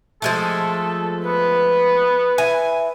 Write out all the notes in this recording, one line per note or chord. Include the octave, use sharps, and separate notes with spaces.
F3 G#3 A3 A4
B3 B4
E4 G#5